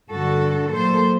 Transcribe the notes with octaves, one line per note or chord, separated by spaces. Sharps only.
G2 D3 G3 F#4 A4
A#2 F#3 A#3 A4 C5